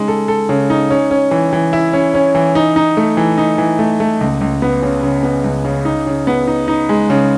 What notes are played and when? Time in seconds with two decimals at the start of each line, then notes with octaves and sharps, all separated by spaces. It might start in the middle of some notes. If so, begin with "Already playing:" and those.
Already playing: C#3 G#3 D#4
0.08 A4
0.28 A4
0.49 C#3
0.70 D#4
0.90 C#4
1.11 C#4
1.31 E3
1.53 E3
1.73 E4
1.93 C#4
2.14 C#4
2.35 E3
2.55 D#4
2.76 D#4
2.97 A3
3.17 E3
3.38 D#4
3.58 E3
3.79 A3
4.00 A3
4.21 C#2
4.41 C#2
4.62 B3
4.82 C#3
5.03 C#3
5.23 B3
5.44 C#2
5.65 C#3
5.85 D#4
6.07 C#3
6.27 B3
6.47 D#4
6.68 D#4
6.89 G#3
7.10 C#3